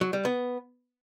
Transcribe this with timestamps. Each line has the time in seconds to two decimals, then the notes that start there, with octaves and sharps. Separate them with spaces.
0.01 F#3
0.13 G3
0.25 B3